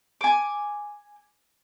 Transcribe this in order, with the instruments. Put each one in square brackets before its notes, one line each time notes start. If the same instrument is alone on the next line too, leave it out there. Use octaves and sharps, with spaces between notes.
[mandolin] G#5 D6